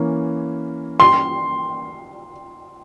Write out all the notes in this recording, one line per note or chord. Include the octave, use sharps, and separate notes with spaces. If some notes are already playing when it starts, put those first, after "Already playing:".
Already playing: E3 A#3 C#4
C6